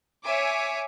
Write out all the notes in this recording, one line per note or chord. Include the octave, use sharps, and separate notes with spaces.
C#5 E5 G#5 D6